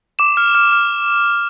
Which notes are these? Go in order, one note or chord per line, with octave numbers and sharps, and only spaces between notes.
D6 E7
F6
F6
F6